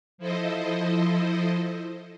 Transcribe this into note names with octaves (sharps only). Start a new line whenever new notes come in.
F3 E4 A4 C5 D#5